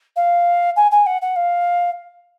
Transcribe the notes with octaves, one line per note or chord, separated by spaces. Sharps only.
F5
G#5
G#5
F#5
F#5
F5